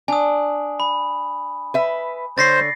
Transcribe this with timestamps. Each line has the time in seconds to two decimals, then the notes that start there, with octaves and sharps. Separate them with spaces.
0.08 D4 G#5 D#6
0.80 B5
1.74 B4 E5
2.38 D3 C5 C#5 A6 A#6 C7